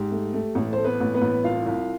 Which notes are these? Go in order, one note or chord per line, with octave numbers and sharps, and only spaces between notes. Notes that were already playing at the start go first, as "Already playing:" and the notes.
Already playing: G#2 G4
A3
A3
A1 A3 A4
A3 C5
B3 B4
A1
B3 B4
A1
C2 F4 F5
C2